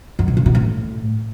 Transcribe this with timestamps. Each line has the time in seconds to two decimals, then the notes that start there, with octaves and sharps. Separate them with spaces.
0.19 F#2
0.28 C3
0.37 C#3
0.46 B2
0.55 A2